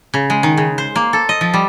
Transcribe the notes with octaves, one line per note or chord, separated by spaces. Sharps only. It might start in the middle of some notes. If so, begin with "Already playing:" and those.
C#3
G#3
D#3
C#3
C5
A#3
A4
D#5
F3
G3